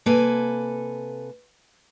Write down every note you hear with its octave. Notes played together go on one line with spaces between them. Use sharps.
C3 A#3 A4 B4 G#5